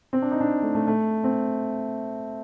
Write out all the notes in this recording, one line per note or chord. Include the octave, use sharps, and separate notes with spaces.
C4
D4
D#4
D4
A3
A3
A3
C4